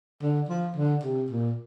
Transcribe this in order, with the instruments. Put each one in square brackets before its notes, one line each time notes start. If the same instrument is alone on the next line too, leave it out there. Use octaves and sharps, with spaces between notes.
[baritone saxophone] D3
F3
D3
C3
A#2